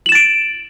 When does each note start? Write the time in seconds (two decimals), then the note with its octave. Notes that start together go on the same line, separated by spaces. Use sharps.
0.06 F#7
0.09 E7
0.12 A6
0.15 D7